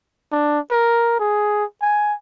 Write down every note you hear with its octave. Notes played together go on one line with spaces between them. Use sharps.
D4
A#4
G#4
G#5